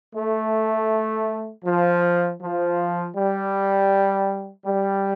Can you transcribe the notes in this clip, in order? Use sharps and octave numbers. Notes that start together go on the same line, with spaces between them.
A3
F3
F3
G3
G3